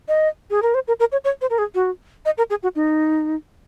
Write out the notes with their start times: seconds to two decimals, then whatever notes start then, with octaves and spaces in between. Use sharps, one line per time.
0.08 D#5
0.50 G#4
0.62 A#4
0.74 C5
0.88 A#4
1.00 A#4
1.12 C#5
1.24 C#5
1.41 C5
1.50 A#4
1.58 G#4
1.75 F#4
2.25 D#5
2.38 A#4
2.50 G#4
2.63 F#4
2.76 D#4